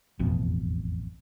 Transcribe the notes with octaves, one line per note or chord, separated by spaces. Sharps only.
E1 A1 F2 B2